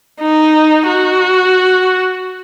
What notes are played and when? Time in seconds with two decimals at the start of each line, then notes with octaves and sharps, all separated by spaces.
0.22 D#4
0.88 F#4